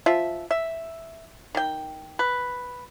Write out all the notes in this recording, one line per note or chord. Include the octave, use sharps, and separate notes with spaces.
F3 F4 E5
E5
D#3 G5
B4